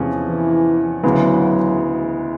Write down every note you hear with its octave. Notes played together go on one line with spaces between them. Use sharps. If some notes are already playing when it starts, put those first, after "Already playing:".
Already playing: E2 C3 F3 G#3 C#4
E3
D2 C#3 E3 F#3 G#3 B3